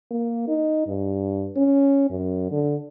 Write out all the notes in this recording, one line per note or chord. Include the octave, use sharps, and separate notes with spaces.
A#3
D#4
G2
C#4
F#2
D3